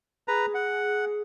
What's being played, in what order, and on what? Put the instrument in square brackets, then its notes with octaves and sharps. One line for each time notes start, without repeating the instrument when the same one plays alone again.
[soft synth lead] G#4 [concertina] B4 A#5
[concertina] F#5